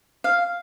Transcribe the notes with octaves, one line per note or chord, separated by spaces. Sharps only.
F5